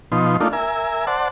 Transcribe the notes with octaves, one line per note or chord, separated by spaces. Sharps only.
B2 F3 D#4 C6
A3 A#3 D4 D#4 F4
A#4 E5 G#5
C5 D5 F#5 A5